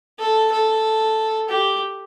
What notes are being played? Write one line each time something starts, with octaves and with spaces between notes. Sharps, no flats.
A4
A4
G4